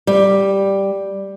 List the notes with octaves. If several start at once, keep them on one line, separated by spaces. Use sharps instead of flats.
G3